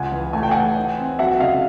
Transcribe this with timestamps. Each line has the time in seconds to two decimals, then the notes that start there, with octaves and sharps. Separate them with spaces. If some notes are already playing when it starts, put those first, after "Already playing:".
Already playing: C#2 F#5 G#5
0.12 E3
0.33 A3 G#5
0.43 G5
0.51 E3 F#5 G#5
0.76 D#4
0.98 C4
1.19 F#3 E5 F#5
1.40 C#3 D#5 F5